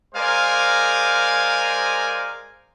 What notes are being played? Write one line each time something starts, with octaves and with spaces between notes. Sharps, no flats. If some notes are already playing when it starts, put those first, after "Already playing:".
G#3 A#4 C5 D5 F5 G#5